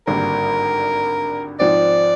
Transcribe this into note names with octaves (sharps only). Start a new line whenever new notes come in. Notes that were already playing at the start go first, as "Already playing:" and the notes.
G#1 G2 D3 G3 A#3 A#4
G#2 F3 C4 D5